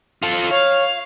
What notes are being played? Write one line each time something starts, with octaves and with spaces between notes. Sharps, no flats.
F4 A4
C#5 F5